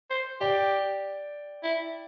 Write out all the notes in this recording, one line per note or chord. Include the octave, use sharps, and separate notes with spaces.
C5
G4 D5 G5
E4